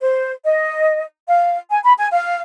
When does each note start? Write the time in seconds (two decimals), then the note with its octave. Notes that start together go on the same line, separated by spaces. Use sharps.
0.01 C5
0.44 D#5
1.28 F5
1.69 G#5
1.84 B5
1.98 G#5
2.11 F5